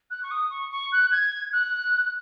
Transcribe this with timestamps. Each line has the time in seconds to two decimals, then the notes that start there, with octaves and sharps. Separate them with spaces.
0.10 F#6
0.23 C#6
0.31 D#6
0.50 C#6
0.71 C#6
0.92 F#6
1.12 G#6
1.53 F#6